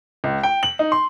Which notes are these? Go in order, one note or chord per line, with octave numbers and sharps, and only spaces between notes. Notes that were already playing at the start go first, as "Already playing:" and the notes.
C#2
G5
F#7
D#4
C6